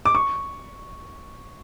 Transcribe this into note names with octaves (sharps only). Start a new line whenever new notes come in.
D6
C#6